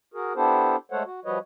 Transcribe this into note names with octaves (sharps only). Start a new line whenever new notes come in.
F#4 G#4 A#4
B3 D4 E4 G4 A4 C5
G#3 A3 A4 C5 C#5 F#5
F#4
F3 G3 F#4 B4 C#5 D#5